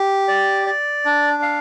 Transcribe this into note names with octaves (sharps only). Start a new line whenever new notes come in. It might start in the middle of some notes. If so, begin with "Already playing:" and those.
Already playing: G4
D5
D5
D4
F5